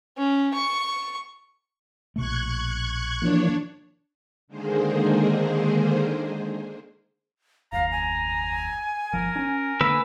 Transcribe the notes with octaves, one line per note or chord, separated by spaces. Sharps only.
C#4
C#6
A#1 B2 A3 C#6 F#6 G#6
E3 F3 A#3 D4 C#5
D3 D#3 G#3 A#3 G#4 C5
F#1 D#2 F5 A#5
G#5
G1 F3 A#4
C#4 D4
D3 A3 A#3 B4 E6